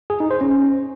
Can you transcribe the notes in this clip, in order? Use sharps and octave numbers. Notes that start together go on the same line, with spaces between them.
G#4
D#4
C5
C#4